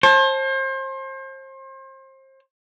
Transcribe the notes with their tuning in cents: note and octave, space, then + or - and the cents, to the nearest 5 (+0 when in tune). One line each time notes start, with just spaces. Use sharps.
C5 +35 A5 -10